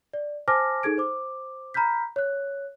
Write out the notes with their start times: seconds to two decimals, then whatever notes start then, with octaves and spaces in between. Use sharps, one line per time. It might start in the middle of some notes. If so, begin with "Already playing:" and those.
0.13 D5
0.48 C5 G#5 A5 D6 F6 A#6
0.83 D#4 G#4 A4 G#6 D7
0.98 C5 D6
1.74 A#5 B5 F6 G6 B6
2.16 C#5 F#6